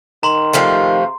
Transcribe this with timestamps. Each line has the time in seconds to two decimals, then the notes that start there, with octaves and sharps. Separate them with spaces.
0.23 D#3 A#5 C6
0.53 C3 F3 A3